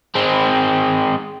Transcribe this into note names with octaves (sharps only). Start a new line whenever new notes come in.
G#3 C4